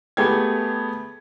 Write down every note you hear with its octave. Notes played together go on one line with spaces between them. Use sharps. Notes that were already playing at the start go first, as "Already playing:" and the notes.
A3 B3 G4 G#4 G#6